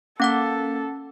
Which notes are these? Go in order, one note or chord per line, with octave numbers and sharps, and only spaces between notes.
A#3 C#4 A4 F#5 D6